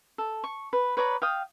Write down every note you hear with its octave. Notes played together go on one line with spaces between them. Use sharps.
A4
C#6
B4
B4 C#5 D5 A#5
F5 G5 D#6